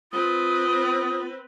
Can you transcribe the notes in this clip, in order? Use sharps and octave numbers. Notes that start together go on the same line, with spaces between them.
C4 F4 B4 D#6